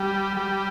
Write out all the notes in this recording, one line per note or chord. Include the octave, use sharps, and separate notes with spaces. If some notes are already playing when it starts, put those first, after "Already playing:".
Already playing: G3
G3